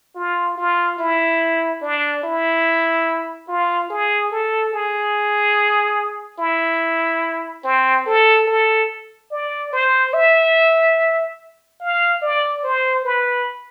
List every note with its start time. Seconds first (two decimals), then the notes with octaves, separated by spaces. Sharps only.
0.16 F4
0.58 F4
0.99 E4
1.82 D4
2.23 E4
3.48 F4
3.90 G#4
4.31 A4
4.73 G#4
6.39 E4
7.64 C4
8.06 A4
8.47 A4
9.31 D5
9.73 C5
10.14 E5
11.80 F5
12.22 D5
12.64 C5
13.05 B4